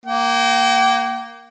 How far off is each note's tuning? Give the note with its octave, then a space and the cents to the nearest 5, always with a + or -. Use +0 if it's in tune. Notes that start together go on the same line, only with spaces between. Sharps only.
A#3 +0 G5 -35